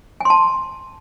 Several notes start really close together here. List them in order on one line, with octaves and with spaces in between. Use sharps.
G#5 C6 A5